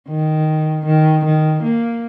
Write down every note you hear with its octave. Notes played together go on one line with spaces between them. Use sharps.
D#3
D#3
D#3
A#3